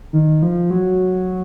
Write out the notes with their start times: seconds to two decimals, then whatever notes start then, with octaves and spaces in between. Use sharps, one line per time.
0.13 D#3
0.42 F3
0.70 F#3